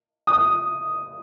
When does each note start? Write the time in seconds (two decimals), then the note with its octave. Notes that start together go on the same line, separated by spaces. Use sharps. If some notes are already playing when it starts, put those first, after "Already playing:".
0.27 D#6